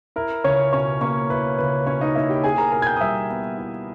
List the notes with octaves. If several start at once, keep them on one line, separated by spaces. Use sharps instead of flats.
E4 A#4
C#2 C#4 C#5
B2 C#4 C#5
A#3 C#4 C#5
E4 B4
C#2 B4
B2 C#4 C#5
D#4 D#5
A#3 E4 E5
G4 G5
E4 G#4 G#5
A#4 A#5
B2 A#4 A#5
G#6
G5 G6
D#6
G3 E5 E6
B3
E4